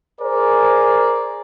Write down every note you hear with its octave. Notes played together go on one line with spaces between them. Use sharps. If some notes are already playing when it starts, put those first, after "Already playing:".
G#4 A#4 C5 D5